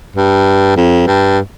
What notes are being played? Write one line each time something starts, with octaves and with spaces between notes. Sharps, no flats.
G2
F2
G2